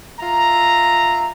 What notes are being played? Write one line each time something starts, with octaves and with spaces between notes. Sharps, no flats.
F4 E5 A#5